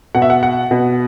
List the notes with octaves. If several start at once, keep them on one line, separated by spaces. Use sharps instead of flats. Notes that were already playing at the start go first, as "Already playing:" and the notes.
B2 F#5
E5
F#5
F#5
B2